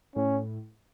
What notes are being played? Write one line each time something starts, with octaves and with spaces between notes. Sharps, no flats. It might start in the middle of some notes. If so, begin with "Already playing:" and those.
A2 C#4